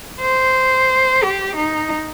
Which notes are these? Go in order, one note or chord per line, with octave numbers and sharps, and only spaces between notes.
C5
G4
D#4